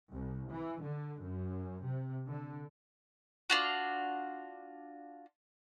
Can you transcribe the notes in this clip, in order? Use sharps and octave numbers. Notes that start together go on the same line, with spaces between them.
C2
E3
D3
F#2
C3
D3
D4 F4 F#4